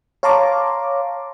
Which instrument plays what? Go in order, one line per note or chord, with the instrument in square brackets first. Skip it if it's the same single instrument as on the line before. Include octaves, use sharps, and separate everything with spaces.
[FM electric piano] C#5 F5 A5 A#5 C6 D6